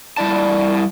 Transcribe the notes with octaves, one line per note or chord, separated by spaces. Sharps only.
G3 E4 D5 A5